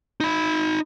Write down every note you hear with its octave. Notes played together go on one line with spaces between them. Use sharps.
D#4 B5